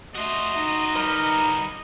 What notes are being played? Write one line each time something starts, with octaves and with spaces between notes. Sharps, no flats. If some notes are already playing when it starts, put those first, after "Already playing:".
A3 F#4 C5 D#5
D#4
G3 B3 A#4